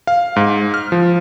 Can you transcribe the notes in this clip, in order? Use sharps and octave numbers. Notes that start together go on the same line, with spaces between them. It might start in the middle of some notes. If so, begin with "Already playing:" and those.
F5
G#2
F6
F3